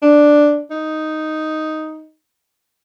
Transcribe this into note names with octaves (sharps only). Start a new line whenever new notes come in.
D4
D#4